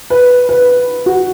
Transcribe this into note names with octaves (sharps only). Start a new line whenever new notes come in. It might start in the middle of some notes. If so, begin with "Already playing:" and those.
B4
B4
F#4